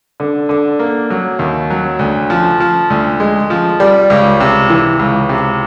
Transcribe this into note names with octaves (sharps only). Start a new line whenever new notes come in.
D3
D3
A#3
F#3
D#2
F#3
D2
F3
F3
D2
G#3
F3
G3
C#2
C3
E3
C#2
C3